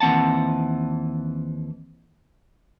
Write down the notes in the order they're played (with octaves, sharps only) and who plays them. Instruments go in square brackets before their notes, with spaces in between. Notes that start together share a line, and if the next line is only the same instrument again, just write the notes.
[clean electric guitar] D#2 E3 C4 F#5 A5